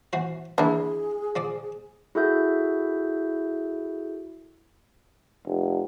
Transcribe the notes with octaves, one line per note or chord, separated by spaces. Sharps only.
E3 F#4 C5
E3 A#3 D4 E4 G#4
F3 D5 D6
E4 F#4 G#4 A4 E5 G6
F1